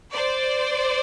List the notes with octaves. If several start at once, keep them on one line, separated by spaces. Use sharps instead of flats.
C5 D5